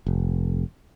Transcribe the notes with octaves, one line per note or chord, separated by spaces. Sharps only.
F1